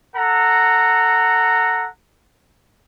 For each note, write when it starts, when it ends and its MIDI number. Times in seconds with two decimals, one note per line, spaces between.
0.15 1.88 69
0.15 1.88 78
0.15 1.88 82